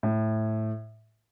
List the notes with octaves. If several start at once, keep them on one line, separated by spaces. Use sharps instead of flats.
A2